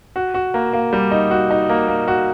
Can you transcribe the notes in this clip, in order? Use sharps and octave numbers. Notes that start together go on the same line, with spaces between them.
F#4
F#4
A#3
A#3
G3
D#4
F#4
D#4
A#3
A#3
F#4